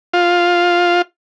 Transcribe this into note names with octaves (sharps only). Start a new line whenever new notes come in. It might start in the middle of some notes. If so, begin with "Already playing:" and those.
F4